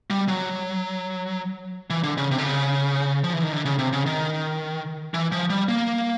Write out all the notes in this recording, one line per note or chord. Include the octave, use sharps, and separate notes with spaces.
G3
F#3
E3
D3
C#3
C3
D3
C#3
F3
E3
D#3
D3
C#3
C3
C#3
D#3
E3
F3
G3
A#3